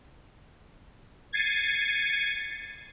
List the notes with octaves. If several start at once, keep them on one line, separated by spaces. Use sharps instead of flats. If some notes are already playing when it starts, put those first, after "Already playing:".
G#6 A6 C7 C#7 D#7